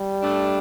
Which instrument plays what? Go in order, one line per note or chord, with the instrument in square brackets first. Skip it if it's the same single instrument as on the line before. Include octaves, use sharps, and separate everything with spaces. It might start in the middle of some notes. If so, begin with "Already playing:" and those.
Already playing: [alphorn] G3
[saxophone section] A3 D4